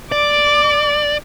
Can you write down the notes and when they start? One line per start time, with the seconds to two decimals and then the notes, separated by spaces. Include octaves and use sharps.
0.12 D5 D6